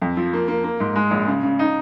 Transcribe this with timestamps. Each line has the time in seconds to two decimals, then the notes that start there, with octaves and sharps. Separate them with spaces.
0.02 F2
0.17 F3
0.33 A#3
0.48 A#3
0.64 A#3
0.80 G#2
0.96 G#3
1.11 A#1
1.27 C#3
1.43 C#3
1.59 D#4